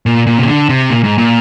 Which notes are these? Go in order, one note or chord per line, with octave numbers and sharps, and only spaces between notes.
A#2
A#2
C3
D3
C3
A#2
G#2
A#2